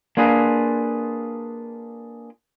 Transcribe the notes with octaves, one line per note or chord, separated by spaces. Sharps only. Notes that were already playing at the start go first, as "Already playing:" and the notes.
A#3 D4 F4 G#4 B4